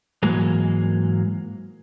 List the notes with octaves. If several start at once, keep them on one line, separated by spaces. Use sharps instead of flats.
G#2 E3 F#3 G#3 A#3